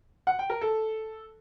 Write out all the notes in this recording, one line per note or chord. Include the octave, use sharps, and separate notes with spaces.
F#5
G5
A#4
A4